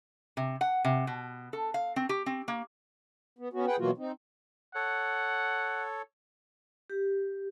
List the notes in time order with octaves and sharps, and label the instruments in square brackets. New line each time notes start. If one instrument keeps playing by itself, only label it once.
[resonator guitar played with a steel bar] C3
F#5
C3
B2
A4
F5
C4
G4
C4
A#3
[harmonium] B3
B3 C#4 F#4
G#4 B4 F#5 G5
B2 E3 F#3 A#3 F4 F#4
C4 D#4
[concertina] A4 C#5 [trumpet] F#5
[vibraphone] G4